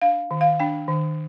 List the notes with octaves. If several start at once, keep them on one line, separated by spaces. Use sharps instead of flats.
D4 F5
D#3
F5
D4 G5
D#3